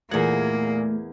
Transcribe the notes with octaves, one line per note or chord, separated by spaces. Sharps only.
E2 A#2 A3 A#3 G#4 F#5 G#6